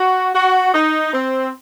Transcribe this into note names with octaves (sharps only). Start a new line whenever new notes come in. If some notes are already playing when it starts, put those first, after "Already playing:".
Already playing: F#4
F#4
D#4
C4